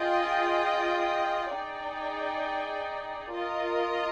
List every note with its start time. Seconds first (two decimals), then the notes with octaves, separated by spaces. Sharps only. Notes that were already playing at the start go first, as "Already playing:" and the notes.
Already playing: F4 G#4 D#5 G5
1.50 D#4 G#4 D5 G5
3.31 F4 A#4 D#5